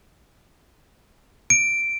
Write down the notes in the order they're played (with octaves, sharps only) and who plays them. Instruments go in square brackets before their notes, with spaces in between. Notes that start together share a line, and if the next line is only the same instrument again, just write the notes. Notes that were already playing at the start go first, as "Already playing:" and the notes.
[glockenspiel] D7